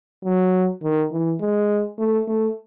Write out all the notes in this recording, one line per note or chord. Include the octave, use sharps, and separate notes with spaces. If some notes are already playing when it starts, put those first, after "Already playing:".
F#3
D#3
E3
G#3
A3
A3